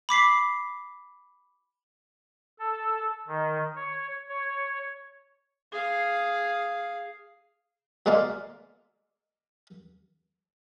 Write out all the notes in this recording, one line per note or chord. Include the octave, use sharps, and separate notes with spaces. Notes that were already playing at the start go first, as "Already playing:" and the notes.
B5 D6 B6 C7
A4
D#3
C#5
C#5
G#4 F5
B2 G#3 A#3 D5 F5